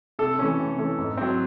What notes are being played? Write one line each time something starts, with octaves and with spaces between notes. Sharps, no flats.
C3 A4
E3 A3 C#4
C3
E3 A3 C#4
G#2
F#3 C4